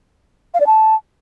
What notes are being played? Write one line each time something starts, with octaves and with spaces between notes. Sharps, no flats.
F5
D5
A5